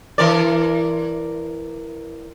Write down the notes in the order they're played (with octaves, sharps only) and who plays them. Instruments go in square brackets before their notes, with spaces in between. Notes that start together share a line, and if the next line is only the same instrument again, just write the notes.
[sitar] E3 A#4 D5